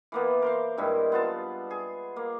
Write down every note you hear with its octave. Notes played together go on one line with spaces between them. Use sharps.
E3 A#3 B3
A#4 C5 F5
G2 D#3 G#3 E4
B3 F4 A5
G#4
A#3